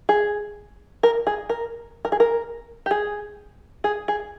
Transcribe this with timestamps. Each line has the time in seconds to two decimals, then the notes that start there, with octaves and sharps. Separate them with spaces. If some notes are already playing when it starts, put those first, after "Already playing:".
0.09 G#4
1.03 A#4
1.27 G#4
1.49 A#4
2.05 A#4
2.12 G#4
2.20 A#4
2.86 G4
2.91 G#4
3.84 G#4
4.08 G#4